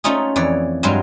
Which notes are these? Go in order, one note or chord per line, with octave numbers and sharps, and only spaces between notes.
A3 C#4 D#4 F4 G#4
F2 E3 C#5 D5
G2 F#3 G#3 F4 C6